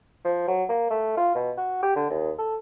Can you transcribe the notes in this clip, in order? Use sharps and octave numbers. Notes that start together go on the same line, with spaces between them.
F3
F#3
A#3
A3
F4
B2
F#4
G4
D3
D#2
A4